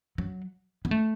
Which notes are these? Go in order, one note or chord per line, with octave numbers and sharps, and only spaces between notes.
F#3
B3
A3